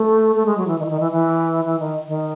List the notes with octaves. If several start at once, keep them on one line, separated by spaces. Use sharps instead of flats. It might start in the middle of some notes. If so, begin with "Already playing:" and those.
Already playing: A3
A3
G#3
F#3
E3
D#3
E3
D#3
E3
E3
E3
D#3
D#3